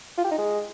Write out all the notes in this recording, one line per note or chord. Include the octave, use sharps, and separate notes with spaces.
F4
G4
D#4
G#3